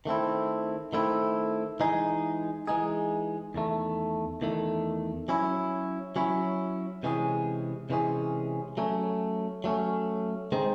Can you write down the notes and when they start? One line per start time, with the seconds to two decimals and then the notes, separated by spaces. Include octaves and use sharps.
0.06 D#3 A3 C4 E4
0.93 D#3 A3 C4 E4
1.80 E3 G#3 D#4 G#4
2.67 E3 G#3 D#4 G#4
3.54 E2 D#3 A3
4.41 E2 D#3 A3
5.28 F#3 C#4 E4
6.16 F#3 C#4 E4
7.03 C3 E3 G#3 C#4 G#4
7.90 C3 E3 G#3 C#4 G#4
8.77 F#3 A3 C#4
9.64 F#3 A3 C#4
10.52 D#3 G#3 C4 D#4